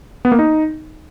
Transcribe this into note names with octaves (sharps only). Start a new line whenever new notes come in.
B3
A#3
D#4